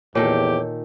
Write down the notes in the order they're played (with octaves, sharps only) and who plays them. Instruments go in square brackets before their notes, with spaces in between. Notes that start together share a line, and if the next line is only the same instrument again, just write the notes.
[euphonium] E2 [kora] A#2 D#3 A4 [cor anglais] G4 [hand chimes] C#5